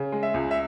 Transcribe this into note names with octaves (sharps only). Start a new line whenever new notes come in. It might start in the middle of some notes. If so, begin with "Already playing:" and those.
Already playing: C#3
G#3
E5
C#2
E5